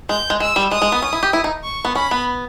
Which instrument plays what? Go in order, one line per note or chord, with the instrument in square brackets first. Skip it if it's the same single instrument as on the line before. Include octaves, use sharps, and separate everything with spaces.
[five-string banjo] G#3 [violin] G6
[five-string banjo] G#3
[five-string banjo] G#3 [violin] E6
[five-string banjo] G3
[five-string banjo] G#3 [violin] D#6
[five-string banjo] G#3
B3
C#4
E4
G4
E4
D#4
[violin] C#6
[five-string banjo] B3
[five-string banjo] C#4 [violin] B5
[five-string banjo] B3